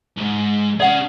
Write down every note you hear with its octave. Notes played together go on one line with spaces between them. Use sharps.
C2 G#2
C#4 G#4 D5 F#5